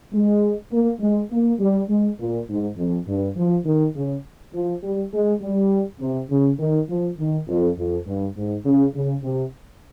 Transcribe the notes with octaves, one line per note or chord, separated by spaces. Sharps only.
G#3
A#3
G#3
A#3
G3
G#3
A#2
G#2
F2
G2
F3
D#3
C#3
F3
G3
G#3
G3
C3
C#3
D#3
F3
D#3
F2
F2
G2
G#2
C#3
C#3
C3